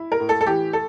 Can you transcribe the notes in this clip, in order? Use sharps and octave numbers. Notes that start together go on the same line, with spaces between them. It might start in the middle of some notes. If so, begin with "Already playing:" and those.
Already playing: E4
A#4
A2
A4
A4
E3 G4
A4